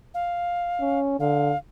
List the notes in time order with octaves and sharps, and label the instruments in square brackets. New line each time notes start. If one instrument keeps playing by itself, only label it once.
[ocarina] F5
[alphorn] C#4
[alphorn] D3 [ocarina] F5